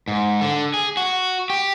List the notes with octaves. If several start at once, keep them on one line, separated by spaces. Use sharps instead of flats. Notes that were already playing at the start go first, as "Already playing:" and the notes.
G#2
D3
G#4
F#4
G4